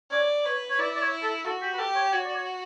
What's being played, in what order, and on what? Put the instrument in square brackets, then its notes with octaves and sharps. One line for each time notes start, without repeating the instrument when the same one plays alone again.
[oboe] C#5 [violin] D5
[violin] B4 [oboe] C#5
[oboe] C#5
[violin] E4 [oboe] D5
[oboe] D5
C#5
A4
[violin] F#4 [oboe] A4
[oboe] G4
B4
[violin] G4 [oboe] A4
[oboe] C#5
[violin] F#4 [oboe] C#5
[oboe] D5
C#5